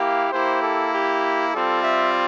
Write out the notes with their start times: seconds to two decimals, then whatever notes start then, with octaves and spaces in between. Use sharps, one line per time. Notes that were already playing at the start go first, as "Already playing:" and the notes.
Already playing: A#3 E4 G4 F5
0.32 A#3 E4 G4 C5
0.62 A4
0.93 G4
1.53 G3 C4 F4 A4
1.83 E5